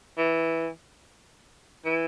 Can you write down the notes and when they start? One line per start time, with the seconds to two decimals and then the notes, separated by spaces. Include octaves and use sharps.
0.18 E3
1.85 E3